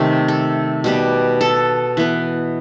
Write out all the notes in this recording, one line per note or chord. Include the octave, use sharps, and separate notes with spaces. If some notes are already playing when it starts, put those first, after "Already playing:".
Already playing: C3 D#3 A3
A4
B2 G3 B3
A4
E3 B3